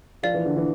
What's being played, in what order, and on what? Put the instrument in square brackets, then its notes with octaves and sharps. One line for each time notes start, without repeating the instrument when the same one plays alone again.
[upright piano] F3 [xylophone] A#4 D5 F5
[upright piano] E3
D3
E3